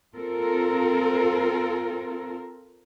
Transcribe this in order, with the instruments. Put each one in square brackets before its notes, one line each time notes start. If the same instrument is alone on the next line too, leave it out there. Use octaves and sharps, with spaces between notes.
[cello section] C4 F4 A4 A#4